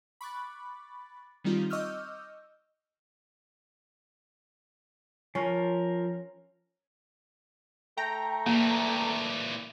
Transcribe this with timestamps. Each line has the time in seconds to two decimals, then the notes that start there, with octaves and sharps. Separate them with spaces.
0.21 B5 C#6 D6 F#6 A6
1.44 D#3 G3 C4 D#4 F4
1.70 D#5 C#6 D6 E6 F6 G6
5.35 F3 C#4 A#4
7.97 A3 G5 A#5
8.46 A#2 E3 A#3